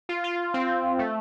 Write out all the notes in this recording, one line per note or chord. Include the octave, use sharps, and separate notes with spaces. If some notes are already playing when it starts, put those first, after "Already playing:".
F4
F4
C4
A3